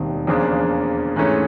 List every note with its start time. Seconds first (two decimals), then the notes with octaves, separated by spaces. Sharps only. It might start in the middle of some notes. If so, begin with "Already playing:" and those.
Already playing: E1 D#2 D#3 G3 C4
0.27 E2 C#3 F3 A#3 D4
1.16 G#2 E3 A3 C#4